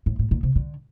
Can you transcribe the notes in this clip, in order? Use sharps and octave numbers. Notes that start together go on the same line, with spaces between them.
A2
A2
A#2
C3
D3